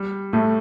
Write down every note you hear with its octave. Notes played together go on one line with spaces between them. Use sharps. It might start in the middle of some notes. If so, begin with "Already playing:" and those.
Already playing: G3
A2 A3